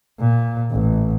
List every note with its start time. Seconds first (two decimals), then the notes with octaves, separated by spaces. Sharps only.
0.20 A#2
0.71 A1